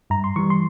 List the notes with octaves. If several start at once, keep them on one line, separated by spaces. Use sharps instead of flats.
G2 A#5
C6
E3 G3 C#6
C6